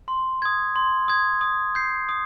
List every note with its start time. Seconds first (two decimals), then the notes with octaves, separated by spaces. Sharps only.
0.08 C6
0.42 D#6 G#6
0.76 C6
1.08 D#6 G#6
1.41 D#6
1.75 G6 C7
2.09 D#6